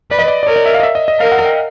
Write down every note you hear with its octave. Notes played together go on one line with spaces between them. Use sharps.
B4 D5
D#5
D5
D5
A#4 C#5
D5
E5
F5
D#5
E5
D#5
D#5
A#4 F5
F#5
G5